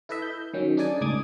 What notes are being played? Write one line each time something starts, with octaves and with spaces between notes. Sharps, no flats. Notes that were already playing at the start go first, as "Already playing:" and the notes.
E4 A4 B4 D#5 E5
G6
D#3 F#3 C#4
D4 D#4 G#4 D5 G#5
C#2 A2 G#3 D6 D#6 G#6